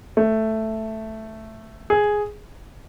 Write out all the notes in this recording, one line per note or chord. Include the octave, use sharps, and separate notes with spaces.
A3
G#4